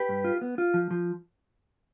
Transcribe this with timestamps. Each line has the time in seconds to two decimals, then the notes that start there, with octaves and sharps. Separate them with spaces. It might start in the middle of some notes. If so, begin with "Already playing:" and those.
Already playing: G4 B4
0.09 G2
0.24 F4
0.41 B3
0.58 F4
0.74 F3
0.91 F3